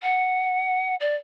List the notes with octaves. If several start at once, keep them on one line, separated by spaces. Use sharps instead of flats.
F#5
D5